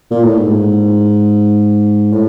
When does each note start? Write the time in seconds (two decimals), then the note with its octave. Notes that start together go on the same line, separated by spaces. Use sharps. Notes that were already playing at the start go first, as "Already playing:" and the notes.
0.11 A#2
0.24 A2
0.37 G#2
2.13 A2